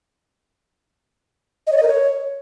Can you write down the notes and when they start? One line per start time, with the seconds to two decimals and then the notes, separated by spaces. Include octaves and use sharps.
1.67 D#5
1.72 C#5
1.77 D#5
1.83 A#4
1.88 C#5